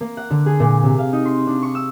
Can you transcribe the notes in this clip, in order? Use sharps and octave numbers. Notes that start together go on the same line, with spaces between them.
A#3
F#5
D3
G#4
A#2
C3
F5
D#4
C6
D4
C#6
E6